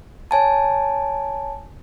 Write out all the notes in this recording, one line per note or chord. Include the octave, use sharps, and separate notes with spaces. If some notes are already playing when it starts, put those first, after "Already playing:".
C#5 G#5 A5